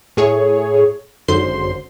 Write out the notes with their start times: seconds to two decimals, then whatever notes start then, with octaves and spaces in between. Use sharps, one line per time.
0.17 A2 G#4 C#5
1.28 G#1 F#2 D3 C5 C6